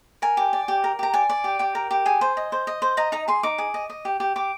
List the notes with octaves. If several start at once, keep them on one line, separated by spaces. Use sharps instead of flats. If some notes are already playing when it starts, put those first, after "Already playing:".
A#4 G#5
G4
D5
G4
A#4
G4 A#5
D5 G#5
D5
G4
G4 G5
A#4
G4
G#4 G#5
C5
D#5
C5
D#5
C5
D#5 A#5
D#4 A#5
G#4 C6
D#4 D6
G#4
D#5
D#5
G4
G4
G4 D6